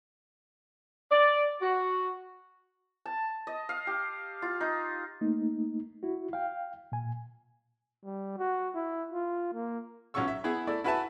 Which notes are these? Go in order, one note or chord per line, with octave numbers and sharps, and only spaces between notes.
D5
F#4
A5
D#5
F5
G4
F4
D#4
A3 A#3 D#4
E4 F#4
F5 G5
A#2 G#5
G3
F#4
E4
F4
A#3
B1 F#3 C#4 F4 C#6 E6
E5
B3 E4 G#4
A3 E4 D5
E4 F#4 B4 E5 G#5 A5